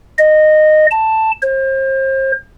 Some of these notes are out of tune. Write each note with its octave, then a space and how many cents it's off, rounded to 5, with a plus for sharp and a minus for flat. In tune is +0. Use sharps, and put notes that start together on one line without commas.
D#5 -15
A5 +5
C5 +35